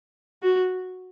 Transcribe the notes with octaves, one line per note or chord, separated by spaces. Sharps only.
F#4